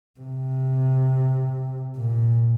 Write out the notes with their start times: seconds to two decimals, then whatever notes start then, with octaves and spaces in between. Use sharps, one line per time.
0.20 C3
1.96 A#2